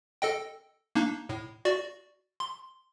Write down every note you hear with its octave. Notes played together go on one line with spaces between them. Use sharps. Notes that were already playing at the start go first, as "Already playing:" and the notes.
A4 D#5 G5
A#3 D4 D#4
A2
F#4 D5
C6